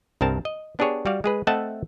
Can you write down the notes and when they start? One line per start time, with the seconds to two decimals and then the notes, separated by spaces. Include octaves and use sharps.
0.21 C2 G2 C4 A#4 A5
0.45 D#5
0.79 B3 D4 G4 G#4 C#5
1.06 G3 F#4 D5 F5
1.24 G#3 G#4 B4
1.47 A3 C4 D#5 E5 F#5 A5